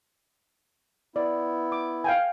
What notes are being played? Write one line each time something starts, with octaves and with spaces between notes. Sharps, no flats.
B3 E4 D5
D6
F5 G5 G#5